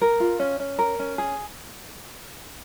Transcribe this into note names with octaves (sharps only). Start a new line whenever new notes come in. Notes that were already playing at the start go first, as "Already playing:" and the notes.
A#4
F4
C#4
C#4
A#4
C#4
G#4